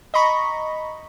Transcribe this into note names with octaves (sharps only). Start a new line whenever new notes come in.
D#5 A#5 B5 C#6